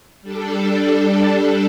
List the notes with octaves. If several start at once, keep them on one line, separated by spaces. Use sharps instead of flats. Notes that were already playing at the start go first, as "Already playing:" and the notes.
G3 D4 A4